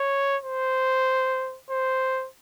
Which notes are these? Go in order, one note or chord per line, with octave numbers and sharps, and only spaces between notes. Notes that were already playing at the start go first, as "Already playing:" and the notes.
Already playing: C#5
C5
C5